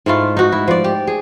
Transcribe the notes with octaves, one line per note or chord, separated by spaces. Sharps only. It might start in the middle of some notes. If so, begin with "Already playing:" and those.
G#2 A3 E4 F4
D#4 F#4
E4
F3 D5
G4
G#4